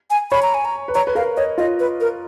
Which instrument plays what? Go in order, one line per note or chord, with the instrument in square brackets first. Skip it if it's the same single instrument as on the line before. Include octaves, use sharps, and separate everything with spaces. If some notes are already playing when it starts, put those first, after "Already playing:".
[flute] G#5
[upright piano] C#5 [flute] B5
[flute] A#5
G#5
A#5
[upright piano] B4
[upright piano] C#5 [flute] A#5
[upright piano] B4
[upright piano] A#4 [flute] F5
[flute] C#5 [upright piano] D#5
[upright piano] F4 [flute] D#5
[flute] B4
A#4